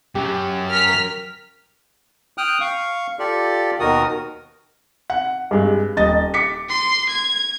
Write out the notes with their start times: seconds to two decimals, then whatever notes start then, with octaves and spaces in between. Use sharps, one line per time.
0.15 F#2 F#3 G4
0.69 A#4 F6 B6
2.38 G5 D#6 F6 F#6
2.61 F5 C#6
3.19 F4 G4 A4 D5
3.80 D#2 B2 D#3 F#4 A#4 D#6
5.10 F#5
5.51 G2 G#3
5.97 D#1 D#5 A6
6.34 D6 B6 C#7
6.69 C6
7.09 G#6